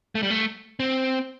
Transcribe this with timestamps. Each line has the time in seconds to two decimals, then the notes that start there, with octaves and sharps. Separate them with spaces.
0.15 A3
0.23 G3
0.30 A3
0.80 C4